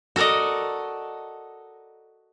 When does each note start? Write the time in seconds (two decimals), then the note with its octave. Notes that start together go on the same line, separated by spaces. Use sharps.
0.16 F#4 A4 A#4 D5 D#5